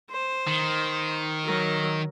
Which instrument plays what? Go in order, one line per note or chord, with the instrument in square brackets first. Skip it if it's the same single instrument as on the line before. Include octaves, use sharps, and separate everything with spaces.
[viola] C5
[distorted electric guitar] D#3
[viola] F#3 A#4